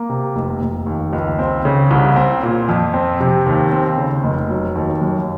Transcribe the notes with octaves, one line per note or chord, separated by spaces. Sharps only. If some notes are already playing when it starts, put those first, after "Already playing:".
Already playing: A#3
C3
F1
F1
D#2
C#2
C4
C#3
C2
C4
A#2
F2
C4
C3
D#2
C4
C#3
F1
F#3
D#2
F#2